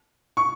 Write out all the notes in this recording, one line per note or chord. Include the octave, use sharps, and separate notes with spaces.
C#6